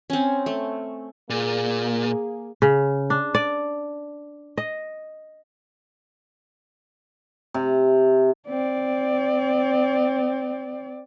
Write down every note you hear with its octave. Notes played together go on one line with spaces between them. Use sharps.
C4 C#4
A3
A#2 A#3 G#4
C#3
D4
D5
D#5
C3
C4 D5